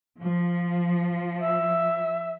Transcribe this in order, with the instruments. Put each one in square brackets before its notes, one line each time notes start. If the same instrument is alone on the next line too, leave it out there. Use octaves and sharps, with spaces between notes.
[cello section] F3
[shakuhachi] E5